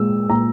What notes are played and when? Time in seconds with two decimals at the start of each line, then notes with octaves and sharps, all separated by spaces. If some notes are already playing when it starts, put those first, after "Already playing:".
Already playing: A#2 G#3 E6
0.30 A#2 A#5